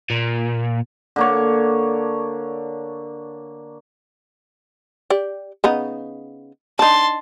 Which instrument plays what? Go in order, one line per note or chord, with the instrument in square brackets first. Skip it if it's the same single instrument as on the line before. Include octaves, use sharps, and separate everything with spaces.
[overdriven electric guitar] A#2
[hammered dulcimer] D3 A#3 C#5
[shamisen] G4 D5
C#3 B3 D#4
[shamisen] D4 D#4 [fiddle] A5 C6